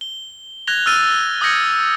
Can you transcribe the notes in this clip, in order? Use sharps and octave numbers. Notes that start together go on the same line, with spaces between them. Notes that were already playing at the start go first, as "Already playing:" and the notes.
G7
F#6 G#6 A#6 F7 G7
E6 F6 A6 D#7
D6 D#6 G6 G#6 A#6 C#7